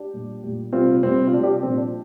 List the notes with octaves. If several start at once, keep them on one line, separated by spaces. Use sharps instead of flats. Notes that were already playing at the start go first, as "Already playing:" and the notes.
Already playing: D4 G4
A#2 G3
A#2 G3
C3 G3 C4 F4
C3 G3 C4
F4
C3 G3 D4
D4 G4
A#2 F3 C4
D4